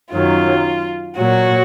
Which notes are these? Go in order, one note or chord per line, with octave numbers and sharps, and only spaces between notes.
F#2 D#3 F#3 F4
A#2 F#3 F#4